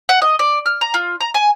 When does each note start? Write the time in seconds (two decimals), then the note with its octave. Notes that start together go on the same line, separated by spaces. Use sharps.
0.09 F#5
0.22 D#5
0.39 D5
0.66 F6
0.81 A#5
0.94 F4
1.21 A#5
1.34 G#5